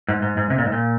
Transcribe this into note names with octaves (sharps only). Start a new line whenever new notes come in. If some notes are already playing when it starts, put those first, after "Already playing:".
G#2
G#2
G#2
C3
A#2
G#2
A#2